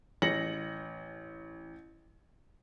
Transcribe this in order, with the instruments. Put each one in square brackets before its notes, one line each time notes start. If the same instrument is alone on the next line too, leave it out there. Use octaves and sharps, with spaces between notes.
[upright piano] A1 A#6 C#7 F#7